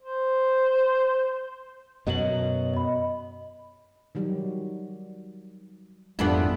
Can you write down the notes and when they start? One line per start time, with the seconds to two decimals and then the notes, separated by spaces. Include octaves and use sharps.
0.02 C5
2.07 F#2 B2 F#3 D#5 F#7
2.74 D#5 B5
4.15 D#3 F#3 G3
6.19 G#1 F2 G3 B3 D4 E4 F4 A4